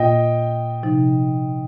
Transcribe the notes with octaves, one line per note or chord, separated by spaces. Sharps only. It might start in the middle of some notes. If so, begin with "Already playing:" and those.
Already playing: A#2 A#3 F4 D#5 G5
C3 F3 D#4